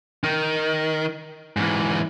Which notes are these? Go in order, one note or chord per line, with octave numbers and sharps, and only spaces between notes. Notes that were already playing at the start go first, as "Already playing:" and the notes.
D#3
G#2 E3